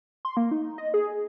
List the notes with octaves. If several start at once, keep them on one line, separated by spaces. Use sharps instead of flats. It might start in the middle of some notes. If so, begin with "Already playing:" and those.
C6
A#3
D#4
D#5
G#4